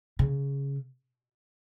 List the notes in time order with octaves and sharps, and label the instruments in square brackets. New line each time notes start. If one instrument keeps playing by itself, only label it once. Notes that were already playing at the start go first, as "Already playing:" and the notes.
[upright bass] C#3